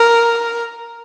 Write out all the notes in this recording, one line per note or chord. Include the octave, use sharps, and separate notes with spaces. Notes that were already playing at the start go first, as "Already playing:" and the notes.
Already playing: A#4